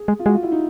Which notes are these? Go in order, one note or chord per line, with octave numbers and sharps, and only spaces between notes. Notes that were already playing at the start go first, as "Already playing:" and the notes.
Already playing: G#4
G#3
F4
G#3 F#4
F4
E4
D#4